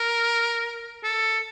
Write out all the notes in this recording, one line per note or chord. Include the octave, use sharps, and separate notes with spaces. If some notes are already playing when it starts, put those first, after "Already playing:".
Already playing: A#4
A4